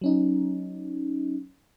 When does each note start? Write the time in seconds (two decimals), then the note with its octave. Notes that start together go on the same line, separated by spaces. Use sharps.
0.01 F#3 C#4 D#4